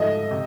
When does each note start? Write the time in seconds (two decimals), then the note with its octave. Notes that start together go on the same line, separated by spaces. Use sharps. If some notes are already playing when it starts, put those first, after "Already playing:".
Already playing: G#2 F3 A3 D#5 E5
0.31 C3